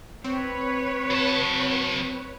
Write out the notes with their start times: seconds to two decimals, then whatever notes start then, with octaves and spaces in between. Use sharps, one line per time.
0.24 C4 B4 C#5
1.11 F#3 A5